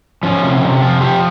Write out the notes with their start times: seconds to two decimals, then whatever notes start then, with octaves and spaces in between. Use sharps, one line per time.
0.23 F3 C#4
0.43 C3
0.63 C3
0.82 F3 F4
1.01 F3 G4